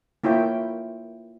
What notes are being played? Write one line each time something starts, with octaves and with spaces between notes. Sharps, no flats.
A#3 E4 F4 C#5 G5